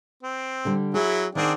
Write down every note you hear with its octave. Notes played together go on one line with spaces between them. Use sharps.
C4
D3 G3
F#3 E4 G#4
D#3 C4 D4 G#4 F5 F#5